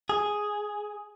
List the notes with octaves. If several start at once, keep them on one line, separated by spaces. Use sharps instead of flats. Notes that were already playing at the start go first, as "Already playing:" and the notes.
G#4